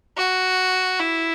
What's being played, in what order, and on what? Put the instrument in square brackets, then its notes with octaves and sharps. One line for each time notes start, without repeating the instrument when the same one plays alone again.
[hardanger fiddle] F#4
E4